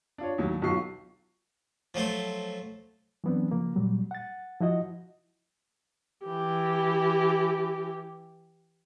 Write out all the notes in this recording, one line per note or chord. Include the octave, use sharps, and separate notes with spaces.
D4 F4 C#5
D#2 A2 F#3
B1 F#3 F4 C#6 C7
F3 F#3 A3 C5
E3 F#3 B3 C4 D4
C#3 F3 A#3
A#2 F#3 G3
F#5 A6
F3 E4 F#4 D#5
E3 G4